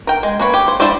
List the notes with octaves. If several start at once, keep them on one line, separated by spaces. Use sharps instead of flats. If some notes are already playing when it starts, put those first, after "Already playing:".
A#4 G5
G#3
A#3 B4 C#5
G4
C5
F3 D4 E4 C5 D5